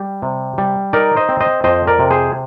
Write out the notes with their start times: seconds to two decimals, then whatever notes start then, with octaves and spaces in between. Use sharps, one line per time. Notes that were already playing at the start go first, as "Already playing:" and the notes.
Already playing: G3
0.22 C3
0.58 G3
0.93 D#4 A#4 D5
1.16 C5 D#5
1.29 C4
1.41 C5 D#5
1.64 F2 C5 D#5
1.87 A#4 D5
1.99 C3
2.11 G#4 C5